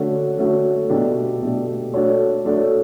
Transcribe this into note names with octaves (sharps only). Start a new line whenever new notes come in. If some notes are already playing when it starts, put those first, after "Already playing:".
Already playing: D3 A3 C#4 F#4
D3 A3 C#4 F#4
B2 A3 D4 G4
B2 A3 D4 G4
A3 D4 F#4 A4 C#5
A3 D4 F#4 A4 C#5